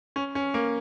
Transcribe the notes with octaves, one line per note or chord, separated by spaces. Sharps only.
C#4
C#4
A#3